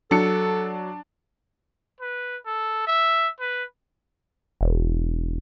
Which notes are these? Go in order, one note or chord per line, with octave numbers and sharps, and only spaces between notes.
F#3 D4 A4 C#7
B4
A4
E5
B4
E1